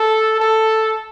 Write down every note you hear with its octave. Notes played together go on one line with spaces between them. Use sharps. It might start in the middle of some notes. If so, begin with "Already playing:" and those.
Already playing: A4
A4